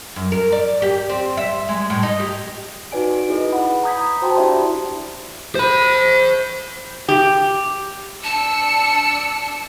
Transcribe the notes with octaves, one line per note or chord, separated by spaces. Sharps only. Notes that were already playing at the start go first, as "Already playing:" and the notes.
F#2
A#4
D5
G4
C4
E5
G#3
A2
D#4
G4
D#4 F#4 B4 D5 G#5 D7
D#4 E4 G#4 B4 D#5
F#5 B5
A#5 B5 D#6 G6 G#6 B6
F#4 C5 G5 A5 C6
D4 E4 G4 D5 E5 B5
C5 B5
G4
D4 A5 E6 C#7